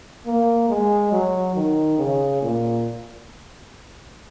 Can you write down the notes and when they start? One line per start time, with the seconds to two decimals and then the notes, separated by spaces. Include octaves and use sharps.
0.26 A#3
0.69 G#3
1.12 F#3
1.55 D#3
1.98 C#3
2.42 A#2